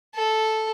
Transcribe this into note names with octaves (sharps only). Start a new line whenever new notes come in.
A4